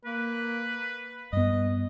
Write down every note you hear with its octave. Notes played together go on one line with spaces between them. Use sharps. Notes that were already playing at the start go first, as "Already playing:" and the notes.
A#3 B4
G2 B3 D#5